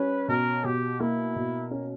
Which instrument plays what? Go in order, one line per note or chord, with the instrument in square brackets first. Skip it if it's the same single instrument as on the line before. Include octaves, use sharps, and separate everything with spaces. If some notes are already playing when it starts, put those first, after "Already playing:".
Already playing: [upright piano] G3 C#4 [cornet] B4
[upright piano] B2 [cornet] A#4
[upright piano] B2 [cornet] G4
[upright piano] A#3 [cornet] E4
[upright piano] B2
C#4